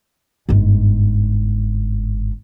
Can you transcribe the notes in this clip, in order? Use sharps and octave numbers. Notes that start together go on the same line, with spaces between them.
G1 G#2